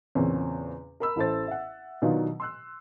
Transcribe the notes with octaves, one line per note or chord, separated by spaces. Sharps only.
E2 A#2 C#3 C4 C#4
A#4 B5 E6
A1 E4 A4 C5 A6
E5 F#5
B2 D#3 F#3 D4 D#4 F4
C6 E6 F#6